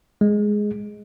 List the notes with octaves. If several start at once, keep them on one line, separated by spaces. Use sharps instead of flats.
G#3